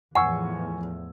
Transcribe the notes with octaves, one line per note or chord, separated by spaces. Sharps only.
E2 A2 F3 F#5 G#5 C#6 E6